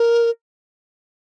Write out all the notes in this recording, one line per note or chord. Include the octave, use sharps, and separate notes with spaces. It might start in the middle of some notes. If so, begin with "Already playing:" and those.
Already playing: A#4